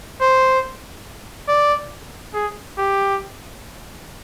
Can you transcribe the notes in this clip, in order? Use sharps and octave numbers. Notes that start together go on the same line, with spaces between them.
C5
D5
G#4
G4